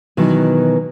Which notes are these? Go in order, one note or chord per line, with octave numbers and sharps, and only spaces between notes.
B2 D#3 E3 F#3